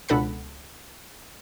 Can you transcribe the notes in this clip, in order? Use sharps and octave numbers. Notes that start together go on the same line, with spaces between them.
C#2 B2 D4 A4 F#5 B5